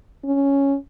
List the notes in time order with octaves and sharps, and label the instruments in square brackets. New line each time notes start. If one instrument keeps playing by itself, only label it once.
[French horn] C#4